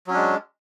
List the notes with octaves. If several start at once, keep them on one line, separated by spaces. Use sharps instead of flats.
F#3 G#3 C#4 D4